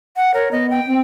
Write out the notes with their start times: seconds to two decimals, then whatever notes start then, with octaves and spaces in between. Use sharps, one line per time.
0.16 F#5
0.34 A#4 C#5
0.52 B3 D#5
0.70 G5
0.87 C4